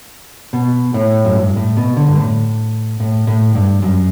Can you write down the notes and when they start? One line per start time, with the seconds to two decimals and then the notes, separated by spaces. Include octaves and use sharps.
0.53 B2
0.94 A2
1.25 F#2
1.35 G2
1.56 A2
1.77 B2
1.97 D3
2.08 G2
2.17 A2
3.00 A2
3.27 A2
3.55 G2
3.82 F#2